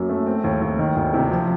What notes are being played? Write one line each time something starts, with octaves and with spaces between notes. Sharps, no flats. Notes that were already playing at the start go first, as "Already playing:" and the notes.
Already playing: F#2 F#3 A#3
A3
C4
D#2
D#2
D#3
D2
C3
F3